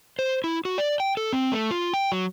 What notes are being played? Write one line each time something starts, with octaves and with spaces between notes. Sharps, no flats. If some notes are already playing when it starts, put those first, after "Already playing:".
C5
E4
F#4
D5
G5
A4
C4
A3
F4
G5
F#3